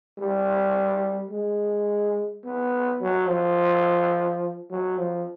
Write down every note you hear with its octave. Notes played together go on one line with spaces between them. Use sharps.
G3
G#3
B3
F#3
F3
F#3
F3